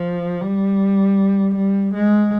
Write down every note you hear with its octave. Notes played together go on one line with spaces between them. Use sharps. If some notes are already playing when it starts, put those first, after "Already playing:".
Already playing: F3
G3
G3
G#3